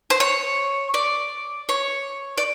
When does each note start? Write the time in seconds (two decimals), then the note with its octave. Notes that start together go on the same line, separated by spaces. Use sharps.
0.10 C5
0.20 C#5
0.94 D5
1.69 C#5
2.38 D5